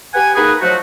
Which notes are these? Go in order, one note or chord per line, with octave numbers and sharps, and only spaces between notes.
G4 B4 F#5 G#5
A#3 D#4 F#4 G#4 B4
F3 F#3 A3 D#4 F#4